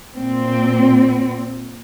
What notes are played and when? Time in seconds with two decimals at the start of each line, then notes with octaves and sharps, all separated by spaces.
0.17 A#2 C4